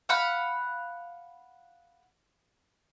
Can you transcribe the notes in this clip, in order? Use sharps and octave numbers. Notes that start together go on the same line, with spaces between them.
F5 F#5 B5